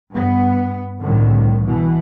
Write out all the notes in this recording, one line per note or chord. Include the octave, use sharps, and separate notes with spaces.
G2 B3
C2 A2 D3 D#3
B2 E3